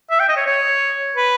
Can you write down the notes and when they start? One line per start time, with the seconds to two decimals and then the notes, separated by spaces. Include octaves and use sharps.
0.11 E5
0.20 G5
0.29 D#5
0.37 C#5
0.47 C#5
1.16 B4